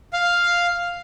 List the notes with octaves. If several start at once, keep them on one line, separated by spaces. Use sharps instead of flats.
F5